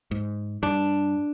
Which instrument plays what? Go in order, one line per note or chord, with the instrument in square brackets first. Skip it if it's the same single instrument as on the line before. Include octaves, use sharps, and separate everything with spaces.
[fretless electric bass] G#2
[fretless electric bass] G2 [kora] D4